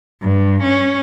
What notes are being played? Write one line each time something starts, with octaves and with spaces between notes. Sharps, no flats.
G2
C#4